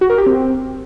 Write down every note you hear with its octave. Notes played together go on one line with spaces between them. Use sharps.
F#4
A#4
G4
C4